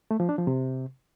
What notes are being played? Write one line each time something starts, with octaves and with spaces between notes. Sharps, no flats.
A3
F3
D4
F3
C3